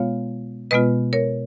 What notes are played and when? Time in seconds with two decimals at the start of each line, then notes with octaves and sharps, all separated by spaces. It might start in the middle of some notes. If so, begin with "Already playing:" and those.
Already playing: B2 G#3 B3 F4 C#5 F5
0.71 B2 G#3 B3 F4 B4 D#5
1.13 A#4 C#5